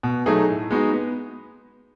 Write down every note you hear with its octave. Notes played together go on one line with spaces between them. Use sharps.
B2
F#3 A3 D#4 G#4
A2
G#3 B3 D#4 F#4
B3